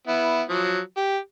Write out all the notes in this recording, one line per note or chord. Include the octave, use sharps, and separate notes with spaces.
B3 E4
F3 F#3
G4